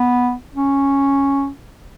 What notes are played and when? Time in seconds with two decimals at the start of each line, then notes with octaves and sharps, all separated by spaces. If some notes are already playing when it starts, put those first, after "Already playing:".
Already playing: B3
0.54 C#4